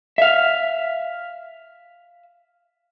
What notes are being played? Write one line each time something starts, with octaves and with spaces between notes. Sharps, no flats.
E5 F5